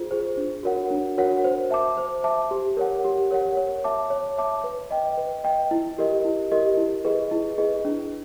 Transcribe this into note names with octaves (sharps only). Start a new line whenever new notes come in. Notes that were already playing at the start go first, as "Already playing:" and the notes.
Already playing: F4 G#4 C5
G#4 C5
D4
F#4 A#4 C#5 F#5
D4
F#4 A#4 C#5 F#5
C5
E5 A5 D6
C5
E5 A5 D6
G4
A#4 C#5 F#5
G4
A#4 C#5 F#5
C#5
E5 A5 D6
C#5
E5 A5 D6
B4
D#5 G5
B4
D#5 G5
E4
G4 A#4 D#5
E4
G4 A#4 D#5
E4
G#4 B4 D#5
E4
G#4 B4 D#5
D4